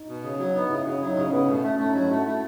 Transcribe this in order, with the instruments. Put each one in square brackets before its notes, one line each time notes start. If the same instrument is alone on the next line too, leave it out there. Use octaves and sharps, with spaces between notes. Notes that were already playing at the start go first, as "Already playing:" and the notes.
Already playing: [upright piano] D#4
[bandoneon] B2
C#3
F#3
[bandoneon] B3 [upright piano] D#4
[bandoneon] C#3 [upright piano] E4
[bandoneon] C#3 [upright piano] F#4
[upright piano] E4
[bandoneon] F#3 [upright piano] D#4
[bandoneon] C#3 [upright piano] C#4
[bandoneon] C#3 [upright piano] B3
[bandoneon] B2 [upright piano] A3
[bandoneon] A3 [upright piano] C#4
[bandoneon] A3 [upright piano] C#4
[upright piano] D#4
[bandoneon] F#3
[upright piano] E4
[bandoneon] A3 [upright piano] F#4
[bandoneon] A3 [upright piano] E4